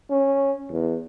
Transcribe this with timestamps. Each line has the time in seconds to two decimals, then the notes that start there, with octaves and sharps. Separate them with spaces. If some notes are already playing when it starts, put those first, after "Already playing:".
0.10 C#4
0.71 E2